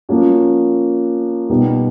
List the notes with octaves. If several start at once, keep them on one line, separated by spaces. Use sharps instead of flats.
F3 A#3 C#4 F#4
B2 G3 B3 D#4